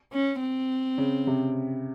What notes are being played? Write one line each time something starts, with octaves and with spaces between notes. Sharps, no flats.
C#4
C4
C#3
C3